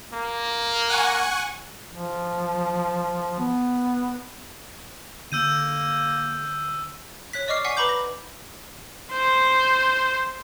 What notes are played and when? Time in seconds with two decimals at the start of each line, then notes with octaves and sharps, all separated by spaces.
0.13 A#3
0.89 F#5 G#5 C#6
1.93 F3
3.40 B3
5.32 D3 A#3 E6 G6 D#7
7.33 C#5 F#6 B6
7.48 D5 D#5 C#6 D6 F6 C7
7.64 D#5 F#5 G#5 C#6 B6 C7
7.77 B4 A#5 B5 D6 G6
7.89 A#6
9.13 C5